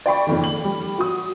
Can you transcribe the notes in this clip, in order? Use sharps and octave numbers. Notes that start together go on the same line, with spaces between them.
D5 G5 B5 C#6
F#1 F2 D#3
F#7
G3
F#4 D#6